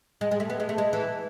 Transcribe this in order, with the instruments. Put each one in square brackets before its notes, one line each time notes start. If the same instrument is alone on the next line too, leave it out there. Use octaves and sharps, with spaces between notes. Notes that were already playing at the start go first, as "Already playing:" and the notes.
[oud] G#3
G#3
A3
B3
G#3
A3
G#3
E3